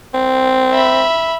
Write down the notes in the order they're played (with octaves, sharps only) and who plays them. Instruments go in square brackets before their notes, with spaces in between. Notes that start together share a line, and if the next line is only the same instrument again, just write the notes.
[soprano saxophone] C4
[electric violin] E5 B5